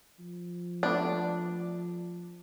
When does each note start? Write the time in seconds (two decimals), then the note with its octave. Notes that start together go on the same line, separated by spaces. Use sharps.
0.19 F3
0.83 A3 B3 D4 D5